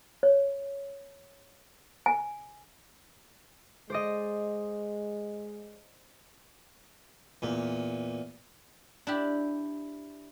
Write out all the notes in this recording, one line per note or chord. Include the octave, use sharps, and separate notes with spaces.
C#5
G#5
G#3 C5 D5 D#5
E2 A#2
D4 E4 G4